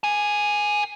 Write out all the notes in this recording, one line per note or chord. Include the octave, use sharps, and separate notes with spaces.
A#4 G#5